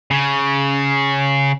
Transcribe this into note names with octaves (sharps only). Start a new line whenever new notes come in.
C#3